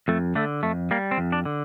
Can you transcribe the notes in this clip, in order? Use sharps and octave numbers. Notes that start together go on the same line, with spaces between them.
F2 A3
D3 A3
F2 A3
G3 A#3
C4
F2
D4
D3